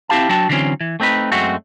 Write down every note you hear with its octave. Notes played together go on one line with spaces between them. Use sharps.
C4 E4 G4 F5 A5
F#3 D4 F#4 G5 A5
D3 E3 F#3 C4 C#4
E3
A3 C4 D#4 B4
F#2 G#3 A3 C4 F#4